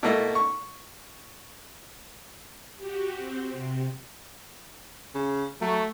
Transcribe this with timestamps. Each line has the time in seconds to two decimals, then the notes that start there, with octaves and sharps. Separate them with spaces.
0.03 B2 A3 A#3 E4
0.35 C#6
2.77 F#4 G4
3.17 C4
3.52 C3
5.15 C#3
5.61 F#3 A3